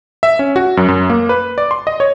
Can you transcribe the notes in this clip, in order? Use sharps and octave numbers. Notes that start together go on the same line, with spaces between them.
E5
C#4
F#4
F#2
F#2
A#3
B4
D5
C6
D#5
C#5